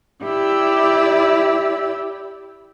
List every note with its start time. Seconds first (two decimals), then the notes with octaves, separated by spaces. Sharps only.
0.25 E4 G4 D5 E6